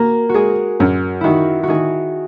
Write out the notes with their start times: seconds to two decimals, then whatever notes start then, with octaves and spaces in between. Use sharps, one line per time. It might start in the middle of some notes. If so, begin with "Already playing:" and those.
Already playing: A#3 F#4 A#4
0.29 F#4
0.34 G#3 G#4
0.80 F#2
1.21 D#3 E4 F#4
1.63 F#4
1.68 D#3 G#4